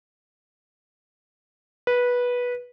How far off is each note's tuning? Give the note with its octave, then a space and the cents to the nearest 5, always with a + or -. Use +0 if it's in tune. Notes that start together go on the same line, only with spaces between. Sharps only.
B4 -15